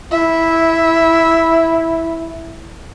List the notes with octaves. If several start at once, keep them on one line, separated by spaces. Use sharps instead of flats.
E4 E5